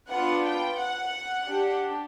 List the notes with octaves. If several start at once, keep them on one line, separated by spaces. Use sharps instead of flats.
B3 D4 F4 F#5
G5
F#5
D4 G4